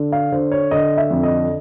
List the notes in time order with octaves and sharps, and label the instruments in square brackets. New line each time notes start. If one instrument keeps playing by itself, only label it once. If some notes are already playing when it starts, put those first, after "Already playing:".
Already playing: [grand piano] D3
F5
D3 C5
C#5
D3 D#5
E5
F2
D#5